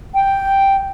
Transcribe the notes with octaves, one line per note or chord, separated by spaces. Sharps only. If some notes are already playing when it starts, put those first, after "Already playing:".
G5